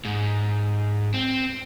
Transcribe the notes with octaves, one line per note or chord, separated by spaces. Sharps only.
G#2
C4